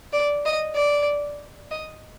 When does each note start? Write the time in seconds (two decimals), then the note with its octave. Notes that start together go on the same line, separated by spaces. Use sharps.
0.13 D5
0.45 D#5
0.76 D5
1.71 D#5